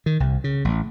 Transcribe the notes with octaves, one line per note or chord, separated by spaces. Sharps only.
D#3
C2
C#3
A1